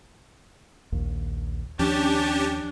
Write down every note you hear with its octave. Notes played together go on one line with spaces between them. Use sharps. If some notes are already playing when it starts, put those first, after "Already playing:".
A#1 D#2
D#2 F3 C#4 D4 G4 A5